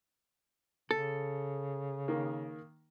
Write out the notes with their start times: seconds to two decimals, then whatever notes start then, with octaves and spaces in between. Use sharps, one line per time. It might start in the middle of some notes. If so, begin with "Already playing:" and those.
0.91 C#3 A4
2.08 D#3 A#3